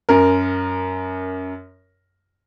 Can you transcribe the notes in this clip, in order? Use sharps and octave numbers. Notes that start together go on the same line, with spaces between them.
F#2 A#4